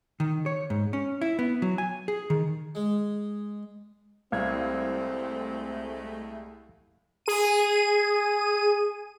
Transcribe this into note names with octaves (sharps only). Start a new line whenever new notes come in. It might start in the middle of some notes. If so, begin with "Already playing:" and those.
D#3
C#5
G#2
C#4
E4
B3
F#3
G#5
G#4
D#3
G#3
C2 G#3 A3 C4 F5 G#6
G#4 D#7